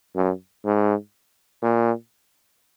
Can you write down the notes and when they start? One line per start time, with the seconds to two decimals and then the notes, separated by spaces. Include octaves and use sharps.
0.16 F#2
0.65 G#2
1.62 A#2